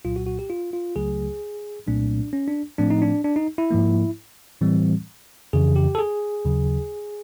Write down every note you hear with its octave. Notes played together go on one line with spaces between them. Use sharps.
C2 A#2 F#3 F4
F#4
F#4
G4
F4
F4
C#2 C#3 F#3 A3 G#4
C2 A#2 F#3 A3 C4 D4
C#4
D4
A2 F3 A3 C4 D4
D#4
D4
D4
D#4
E4
G#2 F3 A#3
A2 E3 G3 C4
F2 C#3 E3 G#4
G4
A4
G#4
D#2 C#3 F#3